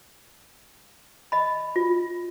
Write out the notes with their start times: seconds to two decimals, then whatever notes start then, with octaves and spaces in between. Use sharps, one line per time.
1.32 D#5 B5
1.76 F4